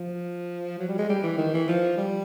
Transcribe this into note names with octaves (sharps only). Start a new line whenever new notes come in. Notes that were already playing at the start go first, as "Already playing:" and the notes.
Already playing: F3
F#3
G3
G#3
G3
E3
D#3
E3
F3
G3